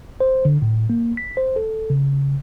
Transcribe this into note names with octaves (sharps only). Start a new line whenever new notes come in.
C5
D3
A2
A#3
B6
C5
A4
C#3